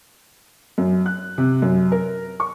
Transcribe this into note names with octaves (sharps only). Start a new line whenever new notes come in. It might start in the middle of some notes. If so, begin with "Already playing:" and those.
F#2
F#6
C3
F#2
A#4
C#6